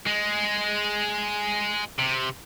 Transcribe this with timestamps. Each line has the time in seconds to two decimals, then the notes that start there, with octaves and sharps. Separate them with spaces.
0.06 G#3
1.99 C3